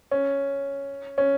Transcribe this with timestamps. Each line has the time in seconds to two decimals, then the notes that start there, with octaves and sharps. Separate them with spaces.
0.11 C#4
1.18 C#4